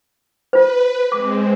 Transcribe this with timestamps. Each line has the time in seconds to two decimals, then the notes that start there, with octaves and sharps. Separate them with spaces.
0.53 F4 B4 C5
1.12 G#3 C4 D6